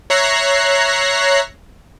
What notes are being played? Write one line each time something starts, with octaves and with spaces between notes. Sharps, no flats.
C#5 E5 A#5 F#6 A#6 C7